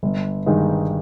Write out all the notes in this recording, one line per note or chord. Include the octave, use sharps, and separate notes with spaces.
G1
G2 D#3 G#3 D#4